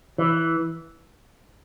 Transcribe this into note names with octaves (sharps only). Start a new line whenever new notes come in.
E3